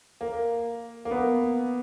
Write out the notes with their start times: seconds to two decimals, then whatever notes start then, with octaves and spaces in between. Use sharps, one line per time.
0.21 A#3
1.05 A#3
1.11 B3